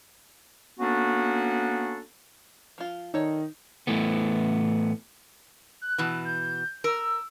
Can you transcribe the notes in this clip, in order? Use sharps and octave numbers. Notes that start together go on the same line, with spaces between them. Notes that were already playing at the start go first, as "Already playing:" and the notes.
A#3 B3 C#4 D4 F#4 A4
F3 F4
D#3 D#4 A4 C#5 D5
A2 E3 A3 B3
F#6
B2 E3
G6
A#4 E6